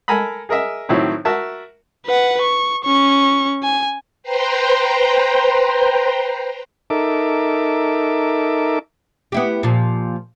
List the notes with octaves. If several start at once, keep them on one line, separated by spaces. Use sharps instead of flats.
A4 A#4 G#5 A#5 B5
G#4 A#4 D#5 E5
A2 D#3 F#3 C4 E4
F#4 A#4 E5 A5
B4 F#5
C#6
C#4 C#6
G#5
B4 C5 G5 A#5 C6
D#4 A4 A#4 E5 D6
B3 E4 G4
A#2 F3